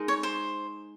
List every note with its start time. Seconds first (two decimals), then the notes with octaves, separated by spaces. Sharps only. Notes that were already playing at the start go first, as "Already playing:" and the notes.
Already playing: G#3 D#4 A#4 D#5
0.08 C#5
0.23 C5